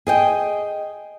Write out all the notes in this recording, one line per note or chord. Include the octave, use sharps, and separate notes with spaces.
G#4 D#5 G5